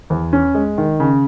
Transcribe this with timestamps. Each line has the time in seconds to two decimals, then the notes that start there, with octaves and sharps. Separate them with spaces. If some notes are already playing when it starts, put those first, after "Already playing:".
0.10 E2
0.33 C#4
0.54 G#3
0.78 D#3
1.00 C#3